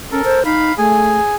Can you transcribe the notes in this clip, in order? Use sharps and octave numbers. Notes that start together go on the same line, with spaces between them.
C#4 A4 A#4
C5
D#4 F5 B5
A3 G#4 G#5